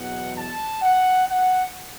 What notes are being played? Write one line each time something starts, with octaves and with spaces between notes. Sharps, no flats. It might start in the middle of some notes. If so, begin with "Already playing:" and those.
Already playing: E2 B2 F#3 F#5
A5
F#5
F#5